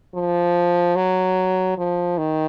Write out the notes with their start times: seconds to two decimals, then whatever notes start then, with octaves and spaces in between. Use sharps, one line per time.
0.14 F3
0.95 F#3
1.78 F3
2.18 D#3